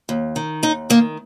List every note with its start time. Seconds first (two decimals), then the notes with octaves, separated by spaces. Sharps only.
0.09 D#2
0.36 D#3
0.63 D#2 D#4
0.90 D#3 A#3